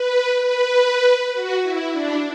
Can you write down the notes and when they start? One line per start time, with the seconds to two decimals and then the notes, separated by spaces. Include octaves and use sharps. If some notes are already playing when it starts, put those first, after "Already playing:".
Already playing: B4
0.45 B4
1.34 F#4
1.63 E4
1.92 D4